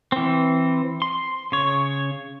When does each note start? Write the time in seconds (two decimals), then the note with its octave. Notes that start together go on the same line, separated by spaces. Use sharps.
0.12 E3 C4
1.02 C6
1.52 C#3 C#5